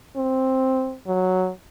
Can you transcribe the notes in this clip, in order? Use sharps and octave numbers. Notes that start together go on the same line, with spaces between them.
C4
F#3